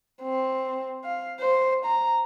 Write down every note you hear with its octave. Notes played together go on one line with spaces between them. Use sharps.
C4
F5
C5
A#5